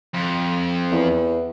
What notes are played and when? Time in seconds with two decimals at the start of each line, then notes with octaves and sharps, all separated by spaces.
0.14 F2
0.91 E2